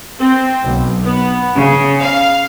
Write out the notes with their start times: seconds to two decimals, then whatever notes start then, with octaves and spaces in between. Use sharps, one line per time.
0.20 C4
0.64 B1
1.05 B3
1.58 C#3
2.00 F5